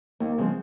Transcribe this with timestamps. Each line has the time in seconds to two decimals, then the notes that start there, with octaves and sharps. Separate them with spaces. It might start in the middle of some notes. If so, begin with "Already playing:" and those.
0.20 D#2 A#3
0.38 C#3 F3 G#3 C4